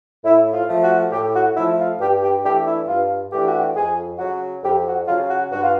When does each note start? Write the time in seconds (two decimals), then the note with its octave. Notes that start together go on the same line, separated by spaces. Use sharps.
0.24 A2 E4
0.53 F4
0.68 F3 A3
0.82 F#4
1.11 A2 G4
1.34 F#4
1.56 F3 E4
1.60 A3
1.78 F4
1.99 G2 G4
2.22 G4
2.44 E3 A3 D4 G4
2.66 E4
2.88 G2 F4
3.31 E3 A3 D4 G4
3.45 F#4
3.58 G4
3.75 F2 G#4
4.19 C#3 F#3 F#4
4.63 F2 G4
4.86 F#4
5.07 C#3 F#3 F4
5.29 F#4
5.51 G2 F#4
5.62 F4